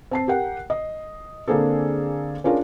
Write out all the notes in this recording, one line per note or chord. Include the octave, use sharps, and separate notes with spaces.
C4 A5 C7
G4 A#4 F#5 G5
D#5
D3 A#3 C4 D4 G#4 A4
C#4 D4 F4 G#4 A#4